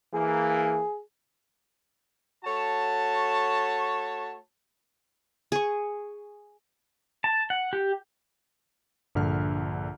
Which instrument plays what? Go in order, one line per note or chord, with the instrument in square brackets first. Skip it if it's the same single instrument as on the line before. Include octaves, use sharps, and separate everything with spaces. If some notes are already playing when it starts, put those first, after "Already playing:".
[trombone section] E3 A#3 [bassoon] G#4
[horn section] A3 F#4 C#5 A5
[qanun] G#4 C#6
[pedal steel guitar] A5
F#5
G4
[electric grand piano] A#1 D3 F6 [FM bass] G2